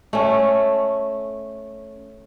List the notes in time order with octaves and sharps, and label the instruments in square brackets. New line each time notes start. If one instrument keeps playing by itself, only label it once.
[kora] A3 C#4